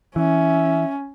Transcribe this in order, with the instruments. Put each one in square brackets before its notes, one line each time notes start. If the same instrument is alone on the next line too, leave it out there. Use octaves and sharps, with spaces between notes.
[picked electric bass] E3 [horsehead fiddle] C#4 [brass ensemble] E5